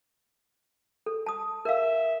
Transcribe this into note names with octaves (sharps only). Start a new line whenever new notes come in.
A4
A5 D#6
A#4 E5 F5